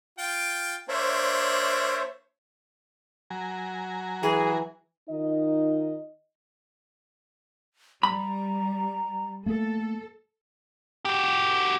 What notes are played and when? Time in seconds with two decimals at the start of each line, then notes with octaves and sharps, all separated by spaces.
0.18 F4 G5
0.89 A#3 D4 C5 C#5 E5
3.30 F#3 G#5 A#5
4.23 E3 G#4
5.10 D#3 D#4 F4 D#5
8.03 G3 A#5 B5
9.46 A3 A#3 A4
11.05 F#4 G4